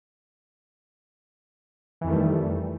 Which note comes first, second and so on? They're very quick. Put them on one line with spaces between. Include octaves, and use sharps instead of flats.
E3 F2 D#3 A3 G3